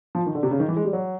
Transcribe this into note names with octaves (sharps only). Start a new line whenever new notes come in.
F3
D#3
D3
C3
C#3
D#3
E3
G#3
G3
F#3